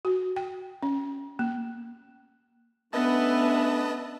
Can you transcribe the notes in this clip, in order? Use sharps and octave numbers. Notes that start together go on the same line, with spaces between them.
F#4
G5
C#4
A#3
A3 B3 C#4 D4 B4 D#5 E5 A5